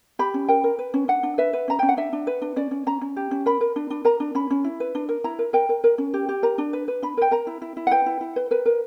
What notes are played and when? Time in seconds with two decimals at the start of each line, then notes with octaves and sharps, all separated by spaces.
0.19 G4 B5
0.34 C#4
0.48 A#4 G5
0.64 A#4
0.79 B4
0.94 C#4
1.08 D4 F#5
1.23 D4
1.38 B4 E5
1.53 B4
1.68 C#4 A#5
1.79 C#4 G5
1.89 F#5
1.97 D4 E5
2.13 D4
2.27 B4
2.42 D4
2.56 C#4 D5
2.71 C#4
2.87 C#4 A#5
3.01 C#4
3.16 G4
3.31 C#4
3.46 A#4 B5
3.61 A#4
3.76 D4
3.90 D4
4.05 A#4 A#5
4.20 D4
4.35 C#4 B5
4.50 C#4
4.64 E4
4.80 B4
4.95 D4
5.09 A#4
5.24 E4 A#5
5.39 A#4
5.53 A#4 G5
5.69 A#4
5.84 A#4
5.98 C#4
6.14 G4
6.29 G4
6.43 A#4 A#5
6.58 D4
6.73 B4
6.88 B4
7.02 D4 B5
7.17 A#4 G5
7.31 A#4 A#5
7.47 E4
7.62 E4
7.77 E4
7.87 F#5
7.91 B4 G5
8.06 E4
8.21 E4
8.36 B4
8.51 A#4 B4
8.66 A#4